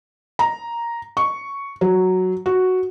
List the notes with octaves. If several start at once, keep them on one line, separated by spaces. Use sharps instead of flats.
A#5
C#6
F#3
F#4